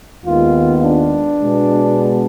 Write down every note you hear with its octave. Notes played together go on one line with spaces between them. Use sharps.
D#2 D#3 G#3 B3 F4
D4
B2 G#3 B3